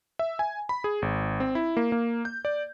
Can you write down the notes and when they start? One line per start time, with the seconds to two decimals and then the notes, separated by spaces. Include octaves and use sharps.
0.19 E5
0.39 G#5
0.69 B5
0.84 G#4
1.02 G#1
1.40 C4
1.55 E4
1.77 A#3
1.92 A#3
2.25 G6
2.45 D5